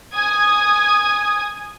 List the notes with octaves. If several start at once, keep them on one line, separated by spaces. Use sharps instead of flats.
G#5 D#6 G#6